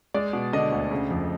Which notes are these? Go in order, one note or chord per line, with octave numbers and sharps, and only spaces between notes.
G#3 D5
B2
D3 D#5
D2
C#3
F2